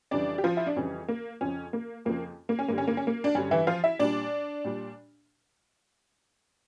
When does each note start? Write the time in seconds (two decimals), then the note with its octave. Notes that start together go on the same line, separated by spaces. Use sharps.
0.11 F2 C#3 E3 G3 D4 D5
0.38 G4
0.44 F3 F4
0.57 E4
0.66 D4
0.76 F2 C#3 E3 G3 C#4
1.08 A#3
1.41 F2 C#3 F3 C#4
1.73 A#3
2.05 F2 C#3 F3 A#3
2.49 A#3
2.59 C#4
2.68 G2 D3 G3 A#3
2.78 C#4
2.87 A#3
2.97 C#4
3.07 A#3
3.24 D4
3.35 G2 D3 G3 C#4
3.51 E3 E4
3.67 F3 F4
3.84 E4 E5
3.99 A#2 G3 D4 D5
4.64 A#2 G3